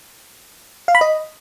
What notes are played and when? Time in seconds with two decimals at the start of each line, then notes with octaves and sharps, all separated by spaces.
0.88 F5
0.95 B5
1.01 D#5